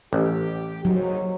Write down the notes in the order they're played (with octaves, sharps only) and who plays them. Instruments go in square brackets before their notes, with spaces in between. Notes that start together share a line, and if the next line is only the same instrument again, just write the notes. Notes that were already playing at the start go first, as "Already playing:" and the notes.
[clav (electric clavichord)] A1 [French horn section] G4
[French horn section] D#2 G#2 D#4 [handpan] F#3